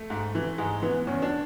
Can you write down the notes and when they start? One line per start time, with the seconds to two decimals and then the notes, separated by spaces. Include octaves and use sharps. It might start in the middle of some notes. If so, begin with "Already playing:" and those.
Already playing: A3
0.10 G#2
0.35 E3
0.58 G#2 G#3
0.82 E3 B3
1.07 E2 C#4
1.22 D4